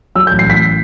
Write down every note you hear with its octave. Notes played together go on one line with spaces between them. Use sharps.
F#3 E6
A1 G6
C7
A1 B6